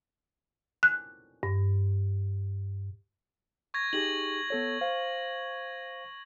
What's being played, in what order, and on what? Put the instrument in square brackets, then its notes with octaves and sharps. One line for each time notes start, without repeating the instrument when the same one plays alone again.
[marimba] F#6
G2
[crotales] C#6 G#6 A#6
[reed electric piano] D#4 G4 G#4 [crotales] A#6 F#7
[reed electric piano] B3 A4 C#5
C5 F5